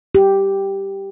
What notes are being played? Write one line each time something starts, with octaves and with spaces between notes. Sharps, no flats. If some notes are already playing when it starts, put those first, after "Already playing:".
G4